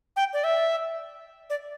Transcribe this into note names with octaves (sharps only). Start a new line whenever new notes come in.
G5
D5
E5
D5